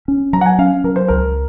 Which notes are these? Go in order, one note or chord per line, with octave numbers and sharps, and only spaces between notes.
C#4
F#3 A#5
F#5
G#5
C#4 F5
F#3 A#4
C5
C#2 A#4